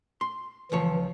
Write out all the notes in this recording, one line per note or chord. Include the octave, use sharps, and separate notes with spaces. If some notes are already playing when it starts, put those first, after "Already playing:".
C6
C#2 E3 F3 C#5